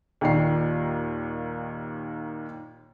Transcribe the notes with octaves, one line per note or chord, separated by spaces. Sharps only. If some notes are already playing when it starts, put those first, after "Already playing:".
D#2 A#2 D#3 D5 C7